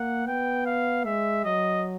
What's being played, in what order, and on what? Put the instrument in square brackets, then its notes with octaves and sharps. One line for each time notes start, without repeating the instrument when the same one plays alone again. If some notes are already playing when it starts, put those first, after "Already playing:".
Already playing: [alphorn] A#3 [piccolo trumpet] F#5
[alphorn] B3 [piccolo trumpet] G5
[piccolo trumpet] F5
[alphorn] G#3 [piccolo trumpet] E5
[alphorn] F#3 [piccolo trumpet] D#5